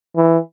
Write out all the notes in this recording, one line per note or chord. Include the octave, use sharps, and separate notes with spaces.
E3